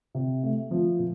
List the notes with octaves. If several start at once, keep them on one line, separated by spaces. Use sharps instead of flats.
C3
A3
F3
A#2